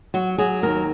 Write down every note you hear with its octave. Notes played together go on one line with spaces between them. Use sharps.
F#3 F#4
F#3 G#4
D#2 A#4